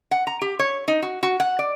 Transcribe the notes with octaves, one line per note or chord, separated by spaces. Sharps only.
F#5
A#5
G4
C#5
D#4
F#4
F#4
F#5
D5